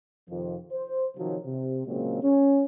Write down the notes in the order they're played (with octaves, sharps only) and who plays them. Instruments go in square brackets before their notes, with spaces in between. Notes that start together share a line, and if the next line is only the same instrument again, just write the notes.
[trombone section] F2 C3 D#3 F3
C5
C3 D#3 F3 F#3
C3
A#2 C#3 F#3 G#3 A#3 C4
C#4